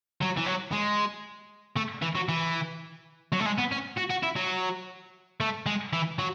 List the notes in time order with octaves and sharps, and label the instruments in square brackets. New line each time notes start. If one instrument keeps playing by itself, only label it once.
[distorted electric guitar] F#3
E3
F#3
G#3
A3
E3
F#3
E3
F#3
A3
G#3
B3
C#4
F#4
F#4
E4
F#3
A3
G#3
E3
F#3